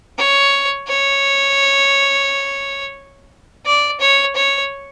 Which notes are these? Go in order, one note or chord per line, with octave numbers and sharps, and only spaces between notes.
C#5
C#5
D5
C#5
C#5